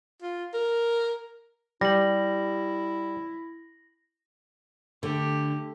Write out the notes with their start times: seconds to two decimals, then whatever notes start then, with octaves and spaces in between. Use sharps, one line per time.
0.22 F4
0.54 A#4
1.81 G3 E4 A#6 F#7
5.03 D3 A3 G4